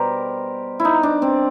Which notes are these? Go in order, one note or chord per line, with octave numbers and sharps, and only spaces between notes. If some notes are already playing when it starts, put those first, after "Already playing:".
Already playing: B2 G3 G4 A#4 C5
E4
D#4
D4
C4